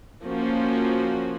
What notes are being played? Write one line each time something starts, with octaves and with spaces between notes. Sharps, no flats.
F3 A#3 C#4 F#4